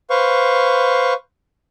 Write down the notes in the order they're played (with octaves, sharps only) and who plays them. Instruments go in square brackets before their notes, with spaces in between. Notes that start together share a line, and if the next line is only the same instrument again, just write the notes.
[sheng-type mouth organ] B4 C5 F5 C#6